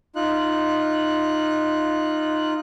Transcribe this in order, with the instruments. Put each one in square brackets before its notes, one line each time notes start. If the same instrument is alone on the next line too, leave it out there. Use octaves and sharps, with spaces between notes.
[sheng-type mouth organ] D#4 F4 F#6